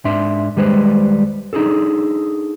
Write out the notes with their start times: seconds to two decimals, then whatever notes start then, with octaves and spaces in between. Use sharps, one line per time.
0.05 G#2 D4 E5 C6
0.56 D#2 G3 G#3 B4 C5
1.53 D4 D#4 F4 G#4 A4